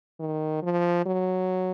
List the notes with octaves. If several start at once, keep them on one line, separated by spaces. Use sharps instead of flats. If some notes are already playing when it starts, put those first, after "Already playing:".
D#3
F3
F#3